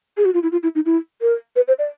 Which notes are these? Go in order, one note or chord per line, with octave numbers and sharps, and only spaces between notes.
G#4
F#4
F4
E4
F4
E4
D#4
E4
A#4
B4
C5
D5